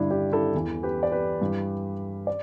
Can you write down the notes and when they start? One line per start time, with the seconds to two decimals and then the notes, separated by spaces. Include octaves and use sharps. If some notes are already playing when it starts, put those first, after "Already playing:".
Already playing: G2 D3 D4 E4
0.11 D4 G4
0.32 E4 A4
0.54 E2 E3
0.83 G4 B4
1.03 D5
1.12 G4 B4
1.41 G2 E3
2.27 D5